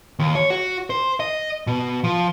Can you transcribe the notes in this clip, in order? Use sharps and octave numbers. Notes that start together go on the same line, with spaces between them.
D#2
C#5
F#4
C5
D#5
B2
F3